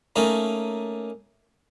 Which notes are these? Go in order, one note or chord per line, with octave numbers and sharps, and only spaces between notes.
A3 A#3 C#4 D#4 A#4